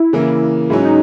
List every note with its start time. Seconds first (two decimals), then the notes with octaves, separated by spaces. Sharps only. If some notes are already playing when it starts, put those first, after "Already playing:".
Already playing: E4
0.13 C#3 E3 A#3
0.70 G#2 F#3 C#4 E4
0.84 D#4